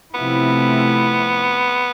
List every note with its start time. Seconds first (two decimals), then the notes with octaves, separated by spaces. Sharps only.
0.14 C3 F3 A3 B3 E4